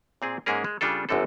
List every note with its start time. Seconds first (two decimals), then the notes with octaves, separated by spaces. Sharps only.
0.22 A#2 C4 G#4
0.46 G#2 G#3 A#3 C#4 G#4 A#4
0.64 G#3
0.81 C#3 G3 D4 F4 A4
1.09 G1 F#2 D3 C4 A4